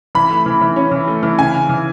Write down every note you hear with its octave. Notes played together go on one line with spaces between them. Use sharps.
E3 B5
A3
E3
E3
C#4
E3
A3
E3
C#3 G#5
C#3
E3